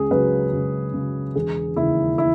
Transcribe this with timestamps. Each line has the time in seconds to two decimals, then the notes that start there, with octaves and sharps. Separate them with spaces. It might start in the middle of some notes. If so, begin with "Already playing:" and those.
Already playing: C#2 G#4
0.11 C#3 F#3 B4
0.53 C#2
0.94 C#3 F#3
1.36 E1 G#4
1.76 D#2 C#3 E4
2.18 E4